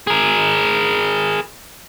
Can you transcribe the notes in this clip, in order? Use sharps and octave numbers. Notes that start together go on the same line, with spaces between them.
G#4 A#4